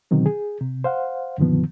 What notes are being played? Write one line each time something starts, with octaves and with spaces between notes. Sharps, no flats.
B2 D3 D#3 F#3 C4
G#4
C3
C5 F5 F#5
F#2 A#2 D3 D#3 F3 B3